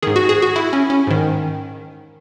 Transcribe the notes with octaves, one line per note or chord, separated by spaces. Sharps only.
G#2 D#3 G#4
F#4
G#4
F#4
E4
C#4
C#4
G#2 D#3